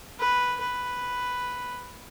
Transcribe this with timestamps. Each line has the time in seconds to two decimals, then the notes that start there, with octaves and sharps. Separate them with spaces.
0.19 B4
0.60 B4